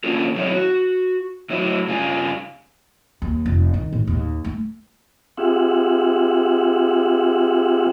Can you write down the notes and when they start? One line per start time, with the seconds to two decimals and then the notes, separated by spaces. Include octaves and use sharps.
0.04 A#3 C#4 D4 F4 A4
0.35 B2 F#3 A3 C4 E4 C#5
0.52 F#4
1.50 A2 F#3 E4
1.87 G2 C#3 F4 G#4 G#5
3.22 D#2
3.46 F1
3.74 D#3
3.92 A2
4.07 D#2
4.44 A3
5.37 C4 F4 G4 G#4 E5 F#5